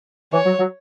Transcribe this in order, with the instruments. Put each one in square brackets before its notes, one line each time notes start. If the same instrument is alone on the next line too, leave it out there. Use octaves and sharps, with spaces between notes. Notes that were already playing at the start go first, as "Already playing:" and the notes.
[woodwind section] E3 [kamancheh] C#5
[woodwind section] F#3
F#3